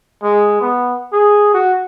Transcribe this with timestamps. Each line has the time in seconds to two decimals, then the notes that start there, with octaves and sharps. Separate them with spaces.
0.23 G#3
0.62 B3
1.12 G#4
1.54 F#4